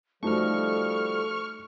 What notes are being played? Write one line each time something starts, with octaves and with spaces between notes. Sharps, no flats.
F3 G3 A3 D#4 F#4 A4 C#6 F6